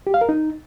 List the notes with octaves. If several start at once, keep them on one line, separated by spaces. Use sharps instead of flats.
G4
F5
A#4
D#4